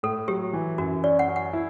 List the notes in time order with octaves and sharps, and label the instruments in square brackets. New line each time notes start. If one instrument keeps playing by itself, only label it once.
[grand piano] A2 [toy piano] A4
[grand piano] F#3 [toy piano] G4
[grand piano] E3
[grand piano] F#2 [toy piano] F#4
[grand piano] C#4 [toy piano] D5
[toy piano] F#5
[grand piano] C#4
[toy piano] F#5
[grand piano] E4